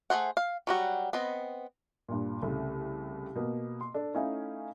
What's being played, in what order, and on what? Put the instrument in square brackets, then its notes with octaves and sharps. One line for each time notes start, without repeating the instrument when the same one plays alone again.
[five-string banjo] A3 G#4 C5 F#5
F5
F#3 G3 F#4
B3 C4 D#5
[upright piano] G2 A#2
C2 C#3 A3
B2 A#3 B3
C6
D4 A4
A3 C#4 D#4 E4 F5 G#5